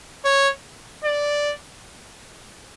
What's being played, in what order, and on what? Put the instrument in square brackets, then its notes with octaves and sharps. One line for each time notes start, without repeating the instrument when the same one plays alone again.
[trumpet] C#5
D5